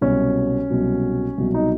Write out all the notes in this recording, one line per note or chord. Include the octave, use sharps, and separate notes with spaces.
C2 B2 F#3 C#4
C2 B2 F#3
C2 B2 F#3
D#4